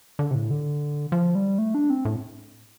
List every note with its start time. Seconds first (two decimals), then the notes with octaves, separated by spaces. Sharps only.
0.19 D3
0.31 C3
0.35 A2
0.51 D3
1.12 F3
1.35 G3
1.58 A3
1.75 D4
1.90 C4
2.05 A2